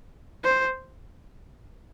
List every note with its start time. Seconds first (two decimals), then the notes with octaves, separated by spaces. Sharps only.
0.44 C5